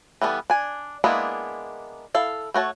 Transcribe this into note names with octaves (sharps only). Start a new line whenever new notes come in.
E3 G3 B3 A4
D4 G#5
G#3 A#3 B3 D4 E4
E4 A4 F5
A3 F#4 C#5 A5